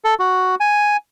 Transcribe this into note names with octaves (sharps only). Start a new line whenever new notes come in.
A4
F#4
G#5